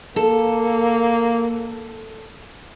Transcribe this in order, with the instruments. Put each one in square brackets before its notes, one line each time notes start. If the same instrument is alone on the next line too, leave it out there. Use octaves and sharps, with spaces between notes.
[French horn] A#3 [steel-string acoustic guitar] A4